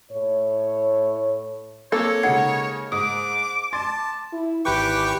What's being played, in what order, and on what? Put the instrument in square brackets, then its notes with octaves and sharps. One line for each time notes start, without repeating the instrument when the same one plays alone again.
[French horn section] A2 C#5
[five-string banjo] A#3 A4 [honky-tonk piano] C4 [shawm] C#5 [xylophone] E6
[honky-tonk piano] C#3 G#3 D#4 [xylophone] F#5 G#6 C7
[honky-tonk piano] G#2 [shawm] D6 [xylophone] D#6
[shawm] A5 [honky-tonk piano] C6 D6 A6
[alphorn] E4
[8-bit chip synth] G#1 G4 C#6 [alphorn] E3 [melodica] B4 G5 D6